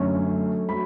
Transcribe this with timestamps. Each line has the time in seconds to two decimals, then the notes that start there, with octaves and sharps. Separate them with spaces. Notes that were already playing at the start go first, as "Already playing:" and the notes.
Already playing: F#2 D3 A3 C#4
0.69 F#3 A3 B5